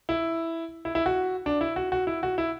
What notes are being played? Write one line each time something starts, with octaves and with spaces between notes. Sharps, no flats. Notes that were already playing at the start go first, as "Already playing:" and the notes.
E4
E4
E4
F#4
D4
E4
F#4
F#4
E4
F#4
E4